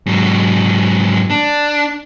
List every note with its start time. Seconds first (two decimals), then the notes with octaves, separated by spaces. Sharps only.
0.06 G#2 F#3
1.30 D4